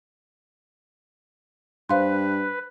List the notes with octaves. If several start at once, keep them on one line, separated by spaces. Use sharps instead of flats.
G2 B4 C5 F5 C6